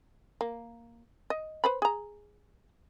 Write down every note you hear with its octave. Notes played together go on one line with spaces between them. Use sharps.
A#3
D#5
B4 C5 B5
G#4 A#5